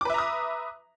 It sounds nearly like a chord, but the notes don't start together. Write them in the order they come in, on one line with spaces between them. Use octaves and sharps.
D6 B4 E5 A#5 D#6